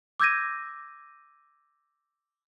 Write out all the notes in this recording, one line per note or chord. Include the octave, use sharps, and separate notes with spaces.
D6 E6 G6 G#6 A#6 D#7